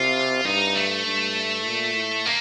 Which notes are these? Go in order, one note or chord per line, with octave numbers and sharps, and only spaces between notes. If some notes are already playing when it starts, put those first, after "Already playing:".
Already playing: C3 F4
G2 D#4
A3
G2
A#2
A2
A#3